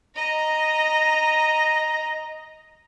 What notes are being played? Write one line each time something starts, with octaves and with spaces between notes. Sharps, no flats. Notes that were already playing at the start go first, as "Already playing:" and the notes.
D#5 A#5